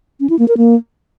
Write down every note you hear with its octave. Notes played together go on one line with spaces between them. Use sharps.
C#4
E4
A#3
A#4
A#3